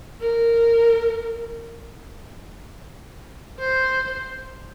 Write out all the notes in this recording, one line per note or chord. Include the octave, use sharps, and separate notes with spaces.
A#4
C5